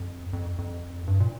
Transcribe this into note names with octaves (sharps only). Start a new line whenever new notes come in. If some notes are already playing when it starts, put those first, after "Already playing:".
Already playing: F2
F2
F2
G2
A#2